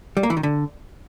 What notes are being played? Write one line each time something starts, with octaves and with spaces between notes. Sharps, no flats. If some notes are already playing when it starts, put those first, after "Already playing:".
G3
A#3
E3
D#3
D3